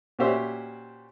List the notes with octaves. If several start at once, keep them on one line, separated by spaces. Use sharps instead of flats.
A#2 C#4 F#4 G4 C5 E5